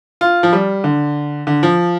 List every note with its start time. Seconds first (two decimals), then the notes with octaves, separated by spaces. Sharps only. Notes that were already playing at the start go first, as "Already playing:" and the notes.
0.21 F4
0.43 F3
0.53 G3
0.84 D3
1.47 D3
1.63 F3